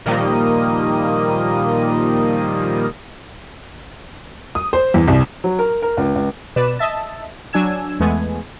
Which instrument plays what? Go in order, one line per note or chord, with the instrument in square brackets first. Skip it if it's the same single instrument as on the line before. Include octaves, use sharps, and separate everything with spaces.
[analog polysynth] A#2 D#3 F3 G3 A#3 D#5
[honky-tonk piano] D#6
C5
E2
C2
[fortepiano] F#3
A#4
A#4
C#2
C#2
[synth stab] B2 B4 D5 E7
D#5 E5 A5
F#3 D4 G#5 E6 G#6 E7
E2 G#3 A3 B3 G#5